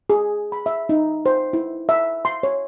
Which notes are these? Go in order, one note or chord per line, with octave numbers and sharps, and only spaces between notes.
G#4
B5
E5
D#4
C5
E4
E5
C6
C#5